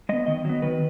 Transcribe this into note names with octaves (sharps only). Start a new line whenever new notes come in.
G#3 B3 D#5
D#3 D#5
F#3 B3
D#3 B4